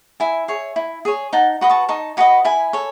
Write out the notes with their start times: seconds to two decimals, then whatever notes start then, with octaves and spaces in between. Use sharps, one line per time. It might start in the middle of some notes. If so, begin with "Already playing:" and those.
0.20 E4 E5 G#5
0.48 G#4 C#5
0.76 E4
1.05 G#4 C#5
1.33 D#4 F#5 A5
1.61 F#4 B4 D#5
1.70 A5 C#6
1.89 D#4 A5 C#6
2.17 F#4 B4 D#5 G#5 B5
2.45 E4 G#5 B5
2.73 A4 C#5